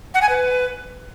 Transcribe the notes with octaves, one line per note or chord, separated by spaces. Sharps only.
F#5
G#5
B4